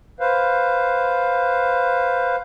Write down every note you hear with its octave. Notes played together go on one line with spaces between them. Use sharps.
B4 C5 F5